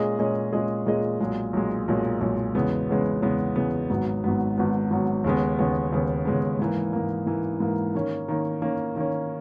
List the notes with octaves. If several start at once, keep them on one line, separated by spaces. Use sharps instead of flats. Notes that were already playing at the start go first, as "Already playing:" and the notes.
Already playing: A#2 G#3 C#4 G#4 D#5
A#2 G#3 C#4 G#4 D#5
A#2 G#3 C#4 G#4 D#5
A#2 G#3 C#4 G#4 D#5
B1 A#2 G#3
B1 A#2 G#3
B1 A#2 G#3
B1 A#2 G#3
E2 C#3 G#3 B3
E2 C#3 G#3 B3
E2 C#3 G#3 B3
E2 C#3 G#3 B3
G#1 G#2 F#3 B3
G#1 G#2 F#3 B3
G#1 G#2 F#3 B3
G#1 G#2 F#3 B3
D#2 C#3 G#3 B3
D#2 C#3 G#3 B3
D#2 C#3 G#3 B3
D#2 C#3 G#3 B3
G#2 E3 A#3
G#2 E3 A#3
G#2 E3 A#3
G#2 E3 A#3
D#3 A#3 C#4
D#3 A#3 C#4
D#3 A#3 C#4
D#3 A#3 C#4